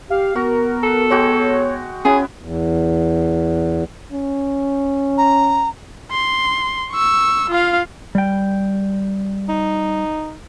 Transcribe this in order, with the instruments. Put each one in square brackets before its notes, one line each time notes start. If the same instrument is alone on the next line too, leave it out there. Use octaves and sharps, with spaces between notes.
[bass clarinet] G4 [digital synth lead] F5
[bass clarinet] B3 [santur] F#4 [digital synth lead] A#4
[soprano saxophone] A4
[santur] G#3 F#4 G5 [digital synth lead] C#5
[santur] B3 E4 [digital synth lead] C#4 [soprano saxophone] G#4
[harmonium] E2
[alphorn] C#4
[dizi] A#5
[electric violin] C6
C#6 E6
F4 F5
[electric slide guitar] G3 G5
[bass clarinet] D#4